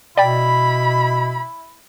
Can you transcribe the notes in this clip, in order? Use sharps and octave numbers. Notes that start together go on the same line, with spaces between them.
B2 E4 D5 G5 B5